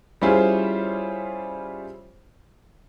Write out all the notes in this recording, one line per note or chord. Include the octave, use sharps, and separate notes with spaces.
G3 C#4 E4 F4 G#4 C5